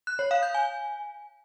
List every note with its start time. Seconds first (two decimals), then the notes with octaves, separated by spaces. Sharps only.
0.07 F#6
0.19 C#5
0.31 F5
0.43 G6
0.54 G#5